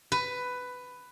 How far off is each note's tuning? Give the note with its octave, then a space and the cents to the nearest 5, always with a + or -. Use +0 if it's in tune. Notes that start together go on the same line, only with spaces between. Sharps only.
B4 +10